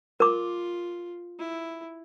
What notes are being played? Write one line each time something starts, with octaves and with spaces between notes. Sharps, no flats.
F4 A#4 D6
E4